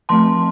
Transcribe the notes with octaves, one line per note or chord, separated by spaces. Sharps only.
F3 A3 C4 A5 C6